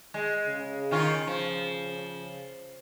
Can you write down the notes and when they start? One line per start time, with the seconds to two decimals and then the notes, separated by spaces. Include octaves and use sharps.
0.14 G#3
0.47 C#3
0.91 D#3 C#4 F4
1.27 F3